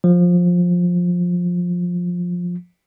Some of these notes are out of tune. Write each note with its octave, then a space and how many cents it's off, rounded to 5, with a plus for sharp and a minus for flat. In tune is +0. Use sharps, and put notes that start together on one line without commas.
F3 +15